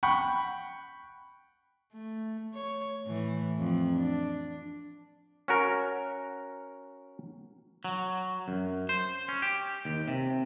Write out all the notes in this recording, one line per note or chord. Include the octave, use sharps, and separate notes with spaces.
F#5 G5 B5 C#6
A3
C#5
A2 E3
F2
D4
C#4 F#4 A#4
F#3
F#2
C5
C#4
G4
D#2
C3